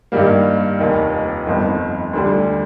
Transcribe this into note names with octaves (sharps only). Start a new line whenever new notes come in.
G2 D#3 G3 A#3
F1 D#2 D#3
G1 F2 D#3
D2 D3 G3